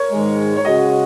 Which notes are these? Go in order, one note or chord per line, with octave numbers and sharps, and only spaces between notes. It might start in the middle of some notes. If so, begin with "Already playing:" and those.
Already playing: A#4 C#5
G#2 D#3 G#3
C#5
C#3 G#3 F#4 D#5